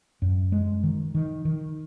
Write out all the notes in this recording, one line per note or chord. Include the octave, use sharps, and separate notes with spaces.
F#2
G#3
D#3
D#3
D#3